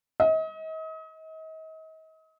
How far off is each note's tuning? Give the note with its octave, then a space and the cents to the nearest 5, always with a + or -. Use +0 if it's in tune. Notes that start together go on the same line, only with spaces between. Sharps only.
D#5 +40